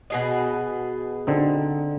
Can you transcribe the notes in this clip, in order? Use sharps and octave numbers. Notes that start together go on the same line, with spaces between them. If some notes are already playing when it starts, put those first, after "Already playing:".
B2 G#4 D#5
D3 C4 D#4